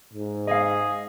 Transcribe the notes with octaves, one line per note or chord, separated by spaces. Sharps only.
G#2
G#4 D#5 F5